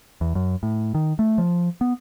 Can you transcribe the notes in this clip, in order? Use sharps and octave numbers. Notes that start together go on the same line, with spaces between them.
E2
F#2
A2
D#3
A3
F3
B3